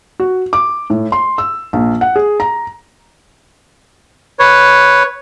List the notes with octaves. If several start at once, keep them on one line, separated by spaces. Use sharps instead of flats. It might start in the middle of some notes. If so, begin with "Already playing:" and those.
F#4
D6
A2
C6
E6
A#1
F#5
G#4
A#5
B4 C#5